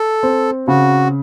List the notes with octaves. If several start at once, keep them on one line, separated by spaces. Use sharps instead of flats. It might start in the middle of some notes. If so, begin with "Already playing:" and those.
Already playing: A4
C4
C#3 F#4